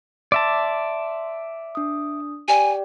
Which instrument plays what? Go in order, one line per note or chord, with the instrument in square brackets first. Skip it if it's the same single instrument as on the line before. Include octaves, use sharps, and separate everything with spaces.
[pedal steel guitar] D5 E5 A5 [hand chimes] C6 D6
[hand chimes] D4 D#6
[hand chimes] G4 D5 G5 [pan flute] G#5